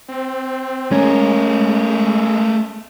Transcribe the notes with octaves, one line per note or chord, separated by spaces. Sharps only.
C4
G#3 A3 C#4 A#4